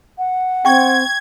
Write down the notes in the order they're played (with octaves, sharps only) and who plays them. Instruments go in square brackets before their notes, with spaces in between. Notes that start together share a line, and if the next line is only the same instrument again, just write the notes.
[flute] F#5
[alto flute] C4 [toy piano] G5 C#6 [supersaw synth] G#6